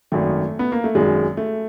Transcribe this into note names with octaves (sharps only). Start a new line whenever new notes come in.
G#1 F#2 D#3 A3
B3
A#3
A3
G#1 F#2 D#3 G#3
A3